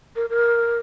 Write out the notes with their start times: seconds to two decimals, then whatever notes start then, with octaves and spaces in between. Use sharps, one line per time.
0.16 A#4
0.30 A#4